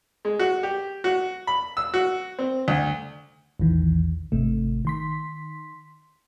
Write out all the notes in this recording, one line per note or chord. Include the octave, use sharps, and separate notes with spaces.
G#3
F#4
G4
F#4
B5
E6
F#4
C4
D2
A#1 E2 D#3 E3
G#1 C3 A3
D#3 C6 B6